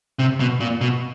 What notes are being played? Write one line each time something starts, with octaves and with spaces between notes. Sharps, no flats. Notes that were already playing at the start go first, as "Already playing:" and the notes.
C3
B2
A#2
B2